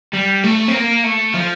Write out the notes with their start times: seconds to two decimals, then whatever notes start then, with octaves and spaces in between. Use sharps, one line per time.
0.13 G3
0.44 A3
0.68 C4
0.74 A#3
1.04 A3
1.34 F3